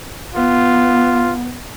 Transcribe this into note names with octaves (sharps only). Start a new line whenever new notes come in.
B3 F4